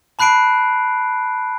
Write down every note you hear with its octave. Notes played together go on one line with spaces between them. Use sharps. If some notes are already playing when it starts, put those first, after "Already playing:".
A5 B5 F#6 C7 D7